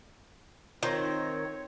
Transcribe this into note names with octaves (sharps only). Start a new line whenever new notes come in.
D#3 C4 F4 C5 C#5